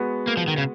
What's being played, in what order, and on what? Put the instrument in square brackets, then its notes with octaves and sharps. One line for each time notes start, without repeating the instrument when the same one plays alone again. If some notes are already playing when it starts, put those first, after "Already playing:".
Already playing: [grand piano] G#3 B3 F#4
[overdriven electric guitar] A#3
F3
D#3
C#3